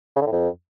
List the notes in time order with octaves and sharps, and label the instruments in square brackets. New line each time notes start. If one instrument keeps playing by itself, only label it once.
[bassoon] C#3
D3
A2
F2